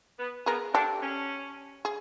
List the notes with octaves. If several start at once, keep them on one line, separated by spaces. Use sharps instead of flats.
B3
B3 G#4 A#4
D4 G4 A4
C#4
G#4